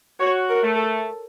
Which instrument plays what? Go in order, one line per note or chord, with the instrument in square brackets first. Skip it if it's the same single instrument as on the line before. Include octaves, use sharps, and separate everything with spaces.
[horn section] F#4 [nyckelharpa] C#5
[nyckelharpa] A#4
[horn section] A3
[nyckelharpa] A4